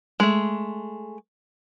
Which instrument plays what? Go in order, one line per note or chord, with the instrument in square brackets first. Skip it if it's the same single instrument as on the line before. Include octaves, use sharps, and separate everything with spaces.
[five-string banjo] G#3 A3